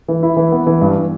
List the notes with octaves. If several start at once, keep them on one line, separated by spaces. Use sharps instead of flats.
E3
E4
E3
B3
E3
G2